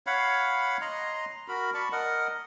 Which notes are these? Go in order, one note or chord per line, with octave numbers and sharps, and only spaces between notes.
C#5 F5 F#5 B5
D#5 A#5 C6
F#4 A#4 B5
D5 A5 B5 C#6
A#4 D#5 F#5